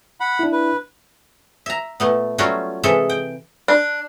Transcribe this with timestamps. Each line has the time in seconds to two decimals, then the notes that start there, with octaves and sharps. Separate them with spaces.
0.20 F#5 B5
0.39 D4 E4
0.52 B4
1.66 E5 A#5
2.00 A#2 A3 B3
2.38 F#3 G3 A3 C#4 F4 F#4
2.83 C3 E3 G#3 A4 E5
3.10 G5
3.68 D4